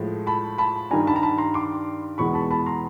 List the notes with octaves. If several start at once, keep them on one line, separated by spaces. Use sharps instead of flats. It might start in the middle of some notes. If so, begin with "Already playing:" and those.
Already playing: A2 F3 G#3
A5 B5
A5 B5
G2 D#3 G3 G#5 A#5
A5 B5
A#5
A5 B5
A#5 C6
C6 D6
E2 B2 G#3 B5 C#6
A5 B5
A5 B5
A#5 C6